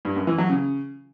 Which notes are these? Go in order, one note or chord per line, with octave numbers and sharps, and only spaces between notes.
G2
F#2
E3
F#3
C#3